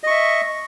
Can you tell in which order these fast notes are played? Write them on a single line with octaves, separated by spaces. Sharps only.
D#5 C#6 E5